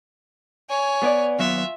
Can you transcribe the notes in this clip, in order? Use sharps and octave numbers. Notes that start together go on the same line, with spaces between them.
C#5 G#5
B3 D5
D#2 F#3 B3 F4 E5